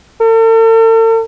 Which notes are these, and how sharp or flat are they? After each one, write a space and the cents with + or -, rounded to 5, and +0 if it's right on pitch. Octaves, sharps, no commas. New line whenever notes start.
A4 +45